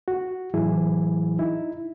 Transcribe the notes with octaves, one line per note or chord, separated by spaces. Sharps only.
F#4
A2 E3 F#3 E4 G#4
D#4 E4